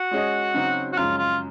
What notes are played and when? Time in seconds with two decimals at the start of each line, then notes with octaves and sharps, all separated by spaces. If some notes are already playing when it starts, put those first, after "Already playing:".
Already playing: F#4
0.11 G#3 C#4 G#4 D#5
0.54 C#3 F#3 C4 D#4
0.93 F#4
0.97 F#2 C#3 F3 G#3 F4
1.18 F4